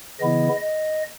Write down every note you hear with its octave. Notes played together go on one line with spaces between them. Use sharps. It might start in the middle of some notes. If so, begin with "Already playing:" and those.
C#3 E3 B3 E4 D#5
D#5